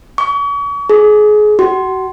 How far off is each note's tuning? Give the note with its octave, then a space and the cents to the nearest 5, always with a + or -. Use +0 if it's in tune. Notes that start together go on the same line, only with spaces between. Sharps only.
C#6 +40
G#4 +25
F#4 +30